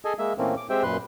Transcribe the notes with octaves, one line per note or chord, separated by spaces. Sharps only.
G#4 A4 D#5 G#5
G#3 A#3 E5
A#2 E3 A3 A#3 C4 C#4
D6
G#3 C4 G4 C5 E5 G5
F#2 A#2 B4 C6 F#6